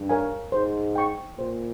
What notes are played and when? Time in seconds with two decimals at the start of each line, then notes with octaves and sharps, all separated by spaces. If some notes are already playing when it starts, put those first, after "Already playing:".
Already playing: G2
0.09 A#4 C#5 F5 G#5
0.52 G#2 C5
0.96 G5 C#6
1.38 A#2 C5